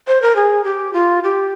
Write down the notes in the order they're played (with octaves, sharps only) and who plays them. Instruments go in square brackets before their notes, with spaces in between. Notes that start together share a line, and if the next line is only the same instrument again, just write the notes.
[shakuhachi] C5
A#4
G#4
G4
F4
G4